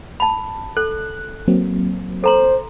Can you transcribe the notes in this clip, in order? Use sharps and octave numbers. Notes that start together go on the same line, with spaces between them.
A5 B5
A4 F#6
F#3 A#3 C4
A4 C5 A#5 C6